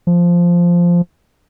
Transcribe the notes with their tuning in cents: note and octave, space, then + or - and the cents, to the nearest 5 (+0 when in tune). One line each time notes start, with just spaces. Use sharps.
F3 -5